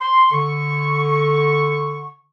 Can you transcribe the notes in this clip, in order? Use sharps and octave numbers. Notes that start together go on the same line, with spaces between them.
C6
D3 C#6